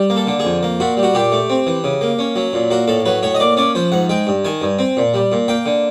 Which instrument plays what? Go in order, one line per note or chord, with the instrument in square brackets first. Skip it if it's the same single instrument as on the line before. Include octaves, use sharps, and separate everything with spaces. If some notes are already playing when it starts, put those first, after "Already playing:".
Already playing: [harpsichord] G3
A#3
A4
D3
G#4
F2
A#3
A#2 F#4
G3
F#4
A#2 G4
A3
C4
E3
C#3
A#3
C#4
F#3
A#2
A#3 F#4
A2 A4
F#3 B4
A2 C#5
D#5
A#3 D5
C#4 D5
F3 C5
G#2 F#5
G#3 G5
G2
D#3 G#5
G2
C4
A#2
G3
A#2
A#3 G5
D3